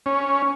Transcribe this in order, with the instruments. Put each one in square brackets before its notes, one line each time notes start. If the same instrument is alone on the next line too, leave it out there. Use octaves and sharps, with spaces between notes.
[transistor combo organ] C#4